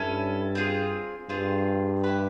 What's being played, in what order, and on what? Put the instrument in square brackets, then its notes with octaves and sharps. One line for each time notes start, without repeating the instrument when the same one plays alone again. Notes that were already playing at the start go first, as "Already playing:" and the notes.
Already playing: [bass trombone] G2 [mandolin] C#4 E4 A4
[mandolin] C4 F4 G#4
[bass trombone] G2 [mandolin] C4 F4 G#4
[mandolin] E4 G4 B4